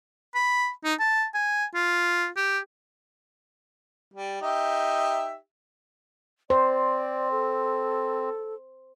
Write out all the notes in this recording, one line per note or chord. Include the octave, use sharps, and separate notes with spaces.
B5
D#4
A5
G#5
F4
G4
G3
D#4 G4 E5
C4 C5 D5
A4